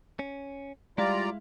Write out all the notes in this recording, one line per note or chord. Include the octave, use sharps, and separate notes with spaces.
C#4
G3 G#3 E4 F4 D5 F5 A#5